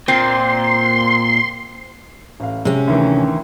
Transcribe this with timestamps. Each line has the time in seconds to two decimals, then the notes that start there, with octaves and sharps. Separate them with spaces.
0.08 A#2 C4 C6
2.40 A1 F5
2.65 C3 G#3 C#4
2.88 D2 D#3 E3